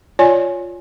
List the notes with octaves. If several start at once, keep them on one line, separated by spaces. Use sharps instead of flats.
F4 C#5 D5 G#5